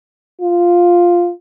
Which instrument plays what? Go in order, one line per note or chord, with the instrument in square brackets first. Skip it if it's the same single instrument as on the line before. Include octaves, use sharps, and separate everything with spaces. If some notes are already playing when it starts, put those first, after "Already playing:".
[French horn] F4